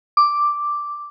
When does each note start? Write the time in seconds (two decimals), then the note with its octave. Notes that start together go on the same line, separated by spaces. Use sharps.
0.17 D6